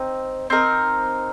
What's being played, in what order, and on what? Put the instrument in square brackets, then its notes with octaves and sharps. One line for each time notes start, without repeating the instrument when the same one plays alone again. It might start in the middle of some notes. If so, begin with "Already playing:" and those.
Already playing: [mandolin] C4 D#4
C4 D#4 A#4